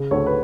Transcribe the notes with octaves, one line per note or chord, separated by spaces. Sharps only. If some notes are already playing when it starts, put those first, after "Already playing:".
Already playing: C#3
D2 A4 C#5
B4